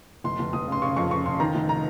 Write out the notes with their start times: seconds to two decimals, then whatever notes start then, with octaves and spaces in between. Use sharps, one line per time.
0.24 F1 C6
0.39 F1
0.53 F1 D#6
0.67 C#3 C6
0.82 C#3 C#6
0.96 F2 C#6
1.11 C#3 C#6
1.25 C#3 C6
1.40 D#3 A#5
1.55 F1
1.69 A#5